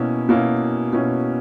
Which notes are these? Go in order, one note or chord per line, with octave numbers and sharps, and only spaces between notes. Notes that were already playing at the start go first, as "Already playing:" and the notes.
Already playing: B2 A#3 C#4 E4
B2 A#3 C#4 E4
B2 A#3 C#4 E4